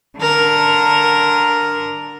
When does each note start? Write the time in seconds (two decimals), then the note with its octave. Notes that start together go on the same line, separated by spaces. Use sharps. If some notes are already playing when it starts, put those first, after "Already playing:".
0.18 D3 A#4